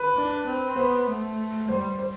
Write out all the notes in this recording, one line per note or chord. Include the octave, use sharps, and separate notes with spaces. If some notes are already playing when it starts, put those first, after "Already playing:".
Already playing: B4
D4
C4
B3 C5
A3
G3 C5
C5